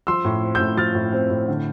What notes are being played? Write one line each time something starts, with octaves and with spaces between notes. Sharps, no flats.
F3 C6 E6
A2
C4
A2 E6 G6
F3 F6 A6
A2
C4
A2
D3